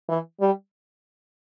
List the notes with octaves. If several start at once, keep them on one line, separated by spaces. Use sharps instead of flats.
E3
G3